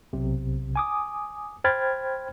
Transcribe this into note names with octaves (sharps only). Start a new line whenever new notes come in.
B1 C3
G#5 D6 D#6
C5 G5 B5 F6 G#6 A6